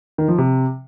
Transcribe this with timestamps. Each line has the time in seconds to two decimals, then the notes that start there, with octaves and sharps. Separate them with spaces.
0.18 D#3
0.28 F3
0.38 C3